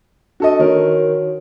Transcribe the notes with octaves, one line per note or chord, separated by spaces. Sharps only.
D4 F#4 A4 D#5
D#3 F#4 A#4 C#5